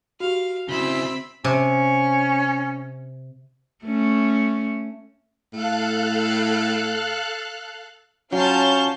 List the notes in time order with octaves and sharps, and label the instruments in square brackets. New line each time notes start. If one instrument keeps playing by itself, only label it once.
[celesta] F#4 G4 [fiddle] F5
[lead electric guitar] C#3 E4 [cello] C4 [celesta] F#4 G7 [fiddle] B5 E6
[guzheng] C3 [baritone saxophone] C#4
[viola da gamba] A3 C#4
[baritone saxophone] A2 [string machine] A4 F5 F#6
[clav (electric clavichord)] F#3 [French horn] C#4 [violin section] F4 A5 [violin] F5 G6